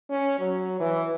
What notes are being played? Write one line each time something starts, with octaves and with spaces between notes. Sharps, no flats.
C#4
F#3
E3